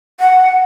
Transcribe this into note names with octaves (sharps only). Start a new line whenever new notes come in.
F#5